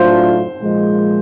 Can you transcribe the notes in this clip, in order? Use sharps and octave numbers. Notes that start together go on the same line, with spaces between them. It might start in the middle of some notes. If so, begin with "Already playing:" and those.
Already playing: A2 F#3 A3 D4 F4 C5
A#2 F3 G#3